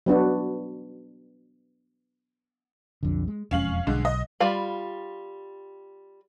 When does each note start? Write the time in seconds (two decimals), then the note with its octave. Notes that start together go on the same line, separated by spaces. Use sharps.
0.06 F#3 B3 D4 F#4
3.03 B1 F2 D3
3.28 G#3
3.51 E1 F2 G#3 C#4 F5 F#7
3.87 B1 D3 G#3
4.05 D#5
4.40 G3 F4 F5 B5